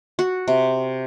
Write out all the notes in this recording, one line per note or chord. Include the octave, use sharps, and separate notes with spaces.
F#4
C3